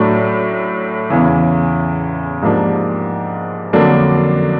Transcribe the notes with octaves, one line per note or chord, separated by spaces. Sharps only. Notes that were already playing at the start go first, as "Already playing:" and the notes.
Already playing: A2 F#3 A3 D4
E2 C#3 E3
G#2 F3 A#3 D4 G4
F2 D3 F#3 A#3 D4